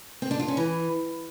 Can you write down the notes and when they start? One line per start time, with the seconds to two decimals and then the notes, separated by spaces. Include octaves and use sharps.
0.22 C4
0.31 D4
0.40 F4
0.48 C#4
0.57 E3